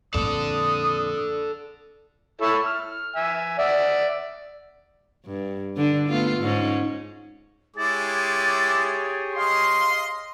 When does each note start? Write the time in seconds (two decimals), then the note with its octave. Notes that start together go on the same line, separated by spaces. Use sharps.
0.14 F2 A#2 A4 D5 D#6
2.41 E4 A4 C#5
2.66 F6
3.16 E5 G#5
3.59 D5 E5 F#5
5.25 G2
5.76 D3 D4
6.09 A3 B3 F4
6.39 G#2 C#4
7.77 G#3 E4 G4 G#4 C#5 D6 A6
9.35 D#5 F5 C6